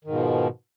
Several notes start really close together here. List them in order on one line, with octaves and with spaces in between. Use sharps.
D#3 G#2 B2 F3